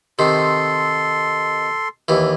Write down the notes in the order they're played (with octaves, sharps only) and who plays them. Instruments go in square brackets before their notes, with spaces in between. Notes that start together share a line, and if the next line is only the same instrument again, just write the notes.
[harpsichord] C3 D#3 [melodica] A4 C6
[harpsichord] D#2 E3